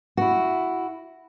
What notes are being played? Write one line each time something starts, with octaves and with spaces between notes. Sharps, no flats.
E4 F#4